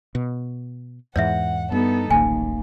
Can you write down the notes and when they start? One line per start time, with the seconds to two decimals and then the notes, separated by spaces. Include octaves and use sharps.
0.15 B2
1.16 E2 G#2 E3 C#5 E5 F#5
1.72 G2 B3 D#4 A4
2.11 D1 A1 D#2 G#5